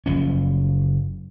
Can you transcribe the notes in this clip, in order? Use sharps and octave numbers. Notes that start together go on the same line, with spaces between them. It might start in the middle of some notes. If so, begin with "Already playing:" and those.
F#1 F3 C#4